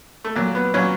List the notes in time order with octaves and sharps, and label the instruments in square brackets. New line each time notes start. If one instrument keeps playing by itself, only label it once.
[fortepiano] A3
A#2 F#3 A#3
B3
A#2 F#3 C#4